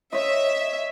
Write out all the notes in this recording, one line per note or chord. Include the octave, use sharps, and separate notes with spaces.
C#5 D#5 E5